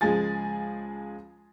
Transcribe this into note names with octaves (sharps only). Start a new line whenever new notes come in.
C#2 F3 G#3 G#4 G#5 A6